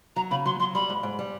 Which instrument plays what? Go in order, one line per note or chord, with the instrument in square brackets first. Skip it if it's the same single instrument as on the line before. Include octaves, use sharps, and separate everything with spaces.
[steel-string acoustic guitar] F#3 [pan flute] A#5
[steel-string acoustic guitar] C#3 [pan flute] B5
[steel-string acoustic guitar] F#3 [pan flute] C6
[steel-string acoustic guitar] F#3 [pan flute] C6
[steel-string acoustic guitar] G3 [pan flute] B5
[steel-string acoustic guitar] G#2
G#2
G3